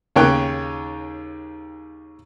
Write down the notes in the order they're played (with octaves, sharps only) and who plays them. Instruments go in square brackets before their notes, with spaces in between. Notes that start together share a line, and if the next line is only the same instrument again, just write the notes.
[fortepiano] D#2 C#3 C#5 G5 F#6